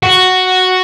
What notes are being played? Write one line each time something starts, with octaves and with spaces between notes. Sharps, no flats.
F#4